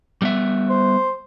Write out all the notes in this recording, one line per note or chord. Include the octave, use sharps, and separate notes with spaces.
G3 B3 E5
C5